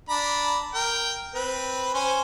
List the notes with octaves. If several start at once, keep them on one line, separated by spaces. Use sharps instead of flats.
D4 A#5 B5
A#4 G5
C4 B4
C#4 C5 G#5